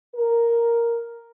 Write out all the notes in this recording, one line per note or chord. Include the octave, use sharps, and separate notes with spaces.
A#4